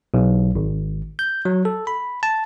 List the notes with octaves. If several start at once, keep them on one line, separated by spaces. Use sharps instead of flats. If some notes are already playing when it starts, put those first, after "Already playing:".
B1
G#1
G6
F#3
A4
B5
A5